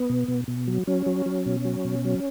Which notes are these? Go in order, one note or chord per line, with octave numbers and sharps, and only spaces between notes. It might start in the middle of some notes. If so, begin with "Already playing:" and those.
Already playing: B3
B2
B2
B2
F#3
F#3 C#4
F#3
F#3
B2
F#3
B2
F#3